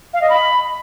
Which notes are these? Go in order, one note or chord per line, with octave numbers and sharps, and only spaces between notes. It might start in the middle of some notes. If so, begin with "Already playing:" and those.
F5
D#5
B5